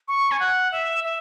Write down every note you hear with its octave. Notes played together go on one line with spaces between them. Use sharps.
C#6
G#5
F#5
E5
E5